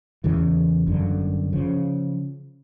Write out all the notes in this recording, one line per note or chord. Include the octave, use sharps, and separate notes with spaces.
E2 C#3 E3
G1 F#2 D3
C#3 F3